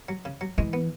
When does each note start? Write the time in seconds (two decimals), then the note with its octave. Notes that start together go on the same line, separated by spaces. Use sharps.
0.09 F#3
0.25 C#3
0.41 F#3
0.58 E3 G#3
0.73 B3